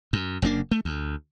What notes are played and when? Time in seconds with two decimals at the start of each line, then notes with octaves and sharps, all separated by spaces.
0.13 F#2
0.42 F#1 C#3 A#3 D4
0.71 A3
0.85 D2